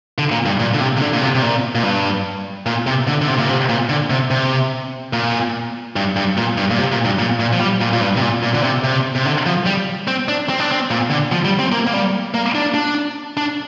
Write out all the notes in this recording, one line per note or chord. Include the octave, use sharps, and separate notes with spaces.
D3
A#2
G2
A#2
D3
C3
C3
D3
A#2
C3
C3
A#2
A#2
G2
A#2
C3
D3
D3
C3
A#2
C3
A#2
D3
C3
C3
A#2
G2
G2
A#2
G2
A#2
C3
A#2
G2
A#2
A#2
F3
G3
A#2
A#2
G2
C3
A#2
A#2
D3
C3
C3
C3
D3
F3
G3
C4
D4
C4
D4
C4
A#2
D3
F3
G3
C4
A#3
A#3
G3
A#3
D4
D4
D4